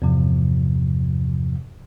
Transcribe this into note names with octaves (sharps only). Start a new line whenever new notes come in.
E2 G2 C3 F3